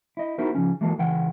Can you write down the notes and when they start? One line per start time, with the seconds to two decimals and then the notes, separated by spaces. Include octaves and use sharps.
0.17 E4 D#5
0.38 B3 D#4 E4 F#4 A#4 C5
0.55 C#3 F3 C#4
0.81 E3 F#3 G#3 A#3 A4
0.98 C#2 E3 F#5 G5